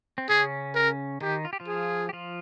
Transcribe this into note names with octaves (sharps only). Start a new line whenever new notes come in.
C4
C#3 C#4 G#4
A#4
D#3 D#4 G4
F4
G4
F3 F4
G#4
G4
F3 F4